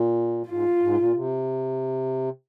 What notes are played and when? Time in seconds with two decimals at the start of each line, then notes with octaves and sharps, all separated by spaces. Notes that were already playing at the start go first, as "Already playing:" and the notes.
Already playing: A#2
0.49 G#2 F4
0.82 G#2
0.98 A#2
1.14 C3